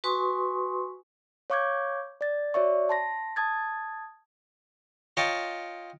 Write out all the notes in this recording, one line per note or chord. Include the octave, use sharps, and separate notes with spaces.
F#4 B4 G#5 C6 C#6 D#6
C#5 F5 C#6 D6 G6 G#6
D5 A6
F#4 C#5 D5 E5 C#6
A5 C6 A#6
A5 D#6 G#6 A6
F4 C#5 D#5 G5 A5